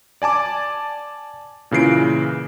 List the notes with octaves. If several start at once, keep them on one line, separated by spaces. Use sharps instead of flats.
D5 G#5 A5 D6
A#2 C#3 E3 C7 D7